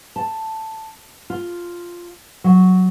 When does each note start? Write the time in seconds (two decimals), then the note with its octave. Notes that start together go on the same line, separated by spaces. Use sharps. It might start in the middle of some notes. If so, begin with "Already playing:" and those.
0.16 A5
1.30 F4
2.44 F#3